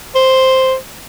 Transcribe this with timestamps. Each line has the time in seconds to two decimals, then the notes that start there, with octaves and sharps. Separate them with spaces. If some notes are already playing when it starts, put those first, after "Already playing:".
0.15 C5